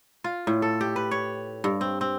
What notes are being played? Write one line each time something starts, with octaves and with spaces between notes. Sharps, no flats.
F4
A2
A4
G4
B4
C#5
G2
C4
C4